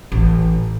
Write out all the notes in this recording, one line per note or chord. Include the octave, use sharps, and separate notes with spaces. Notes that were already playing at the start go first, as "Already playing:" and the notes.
A1